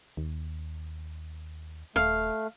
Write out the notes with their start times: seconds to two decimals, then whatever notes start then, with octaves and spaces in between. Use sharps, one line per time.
0.17 D#2
1.96 D#1 A3 F5